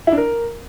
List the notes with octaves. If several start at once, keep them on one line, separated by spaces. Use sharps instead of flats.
E4
D4
A#4